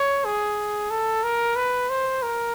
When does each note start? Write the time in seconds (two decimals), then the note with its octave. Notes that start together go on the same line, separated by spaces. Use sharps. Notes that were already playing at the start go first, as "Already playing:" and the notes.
Already playing: C#5
0.25 G#4
0.91 A4
1.24 A#4
1.56 B4
1.90 C5
2.22 A#4